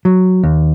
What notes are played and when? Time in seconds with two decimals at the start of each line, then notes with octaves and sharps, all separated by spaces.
0.05 F#3
0.43 D#2